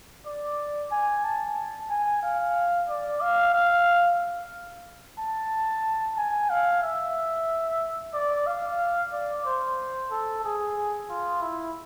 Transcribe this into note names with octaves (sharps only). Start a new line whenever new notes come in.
D5
G#5
A5
G#5
F5
D5
F5
F5
A5
G#5
F5
E5
D5
F5
D5
C5
A4
G#4
F4
E4